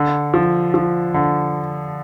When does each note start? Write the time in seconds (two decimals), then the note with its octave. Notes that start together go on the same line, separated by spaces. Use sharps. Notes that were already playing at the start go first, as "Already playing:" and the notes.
Already playing: D3
0.34 F3
0.74 F3
1.14 D3